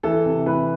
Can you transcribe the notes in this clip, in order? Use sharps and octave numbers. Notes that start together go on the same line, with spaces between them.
E3 A4
C3
E3 B4